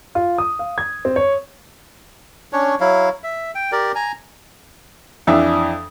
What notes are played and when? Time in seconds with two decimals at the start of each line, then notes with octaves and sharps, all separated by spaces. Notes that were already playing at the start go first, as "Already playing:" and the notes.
0.15 F4
0.38 D#6
0.59 F5
0.78 G#6
1.05 C4
1.16 C#5
2.53 C#4 D4 C#5
2.80 F#3 E4 F5
3.24 E5
3.55 G5
3.72 G4 A#4 D5
3.95 G#5 A#5
5.27 F2 E3 D4 E5